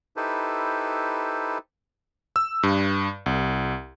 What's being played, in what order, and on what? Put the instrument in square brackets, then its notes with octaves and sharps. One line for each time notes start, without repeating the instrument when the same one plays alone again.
[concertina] D#4 E4 G4 A4 B4 C5
[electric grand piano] E6
G2
C2